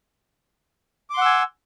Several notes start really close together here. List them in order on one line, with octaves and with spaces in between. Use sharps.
D6 C6 F#5 E6 G#5